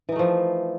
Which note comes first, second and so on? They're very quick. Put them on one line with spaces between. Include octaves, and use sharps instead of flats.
E3 D#4 A3 F3